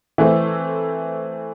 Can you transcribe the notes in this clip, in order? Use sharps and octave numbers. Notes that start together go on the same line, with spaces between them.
E3 A3 C4